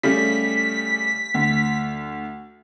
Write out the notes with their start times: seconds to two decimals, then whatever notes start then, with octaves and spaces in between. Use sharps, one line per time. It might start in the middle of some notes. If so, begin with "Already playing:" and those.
0.03 C#3 G3 A3 B6
1.34 D2